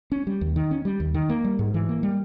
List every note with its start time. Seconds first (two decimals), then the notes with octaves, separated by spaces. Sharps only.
0.12 C#4
0.27 G3
0.41 D#2
0.56 D#3
0.71 C#4
0.85 G3
1.00 D#2
1.14 D#3
1.30 A#3
1.44 G3
1.59 G#2
1.74 E3
1.89 A#3
2.03 G3